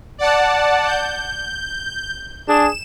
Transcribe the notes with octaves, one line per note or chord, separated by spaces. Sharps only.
D5 F#5 A5
G6
D4 G#4 E7